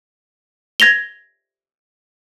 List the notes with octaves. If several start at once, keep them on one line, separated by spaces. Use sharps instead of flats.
G#6 A#6 F7 G7